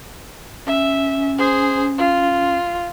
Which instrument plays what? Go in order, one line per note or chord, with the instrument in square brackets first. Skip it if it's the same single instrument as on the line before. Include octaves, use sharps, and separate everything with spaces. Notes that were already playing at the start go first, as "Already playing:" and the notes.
[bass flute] C#4 [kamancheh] E5
[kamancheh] G#4 C5
F4